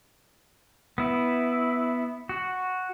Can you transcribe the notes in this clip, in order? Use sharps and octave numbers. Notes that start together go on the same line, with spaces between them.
B3 E4
F#4